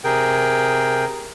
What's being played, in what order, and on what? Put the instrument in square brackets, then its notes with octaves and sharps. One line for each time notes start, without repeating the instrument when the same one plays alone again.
[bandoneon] C3 G#4 A#4 G5